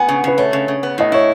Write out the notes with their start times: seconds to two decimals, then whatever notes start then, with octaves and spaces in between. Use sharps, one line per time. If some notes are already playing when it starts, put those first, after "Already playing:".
Already playing: B3 F#5 G#5
0.08 C#3
0.24 C#3 B4
0.38 A3 C#5
0.53 C#3
0.68 C#3
0.83 B3
0.98 A2 D#5
1.12 E4 C#5